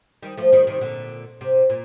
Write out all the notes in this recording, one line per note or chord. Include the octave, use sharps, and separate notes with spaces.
D#3 G3
F3 A3
D#3 G3
C3 D#3
A#2 D3
C3
A#2